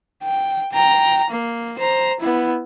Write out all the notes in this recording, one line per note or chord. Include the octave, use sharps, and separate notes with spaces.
G5
G5 A#5
A#3
C5 A#5
B3 E4